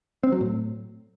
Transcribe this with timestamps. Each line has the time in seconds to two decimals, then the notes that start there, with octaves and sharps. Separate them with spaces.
0.23 C4
0.32 F#3
0.41 A2